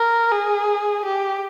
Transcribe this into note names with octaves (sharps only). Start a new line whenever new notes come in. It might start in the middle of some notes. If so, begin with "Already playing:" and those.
Already playing: A#4
G#4
G4